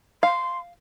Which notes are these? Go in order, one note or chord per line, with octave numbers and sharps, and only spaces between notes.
F5 C6